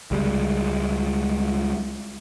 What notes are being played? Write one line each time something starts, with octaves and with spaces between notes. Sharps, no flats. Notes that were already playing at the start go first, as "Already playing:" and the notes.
C#2 G3 G#3